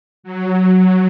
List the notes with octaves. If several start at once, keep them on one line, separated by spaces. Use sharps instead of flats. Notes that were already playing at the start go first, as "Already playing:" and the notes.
F#3